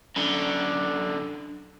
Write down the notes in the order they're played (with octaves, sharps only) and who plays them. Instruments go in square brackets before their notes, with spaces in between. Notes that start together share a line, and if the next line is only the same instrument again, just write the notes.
[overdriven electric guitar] F#2 D3